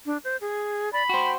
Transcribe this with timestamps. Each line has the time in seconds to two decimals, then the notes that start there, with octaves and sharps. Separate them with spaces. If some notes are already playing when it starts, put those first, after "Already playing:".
0.06 D4
0.24 C5
0.41 G#4
0.93 D5 B5
1.09 F#4 C5 G5